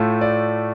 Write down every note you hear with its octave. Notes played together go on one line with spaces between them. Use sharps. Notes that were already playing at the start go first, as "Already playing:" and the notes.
Already playing: A2 A3 F4
D5